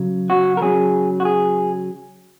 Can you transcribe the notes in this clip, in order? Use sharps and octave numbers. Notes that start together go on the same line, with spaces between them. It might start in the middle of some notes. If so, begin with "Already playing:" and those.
Already playing: C#3 F#3
F#4
A#4
C#3 F#3 G#4
F#4
G#4